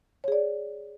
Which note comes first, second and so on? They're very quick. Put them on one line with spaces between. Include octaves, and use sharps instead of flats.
C#5 G#4 D5